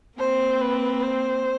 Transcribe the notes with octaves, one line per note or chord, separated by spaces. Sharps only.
A#3 C4 C5
B4
C5